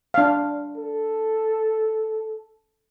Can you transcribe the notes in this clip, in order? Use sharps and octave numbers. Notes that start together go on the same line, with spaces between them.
D4 F5
A4